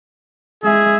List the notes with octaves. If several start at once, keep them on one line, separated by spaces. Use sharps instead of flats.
G#3 G#4 E5